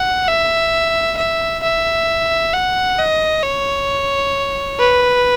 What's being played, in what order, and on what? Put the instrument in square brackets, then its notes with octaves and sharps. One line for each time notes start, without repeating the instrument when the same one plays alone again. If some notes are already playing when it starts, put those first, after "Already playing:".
Already playing: [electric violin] F#5
E5
E5
E5
F#5
D#5
C#5
B4